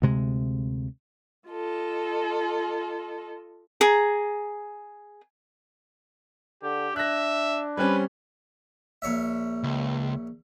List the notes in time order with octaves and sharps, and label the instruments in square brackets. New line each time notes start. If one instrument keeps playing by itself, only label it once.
[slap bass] D2 C3 G#3
[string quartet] F4 A4 D#5
[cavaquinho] G#4 A#5
[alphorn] D3 [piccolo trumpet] G4
[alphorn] D4 [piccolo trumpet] E5 [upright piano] F#6 A#6
[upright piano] G3 C4 C#4 [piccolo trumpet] B4
[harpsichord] A#1 C#5 E5
[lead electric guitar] C#2